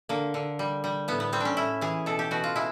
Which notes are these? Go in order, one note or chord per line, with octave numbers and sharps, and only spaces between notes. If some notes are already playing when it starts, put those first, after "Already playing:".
D3 A#3
D3
G3
G3
A2 B3
B3
G3 C4
C#4 D4
A2 E4
E3 G#4
B2 A4
G4
B2 F#4
F4
G#3 E4